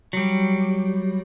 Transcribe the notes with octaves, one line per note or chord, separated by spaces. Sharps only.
F#3 G3